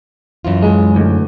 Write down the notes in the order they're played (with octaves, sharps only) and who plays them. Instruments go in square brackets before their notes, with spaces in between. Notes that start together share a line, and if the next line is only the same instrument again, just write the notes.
[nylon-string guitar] F#2 E3 F4
[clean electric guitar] G#3
D2